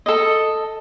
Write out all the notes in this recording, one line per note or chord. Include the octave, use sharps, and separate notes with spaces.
A4 D#5